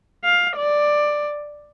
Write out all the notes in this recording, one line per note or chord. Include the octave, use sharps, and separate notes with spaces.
F5
D5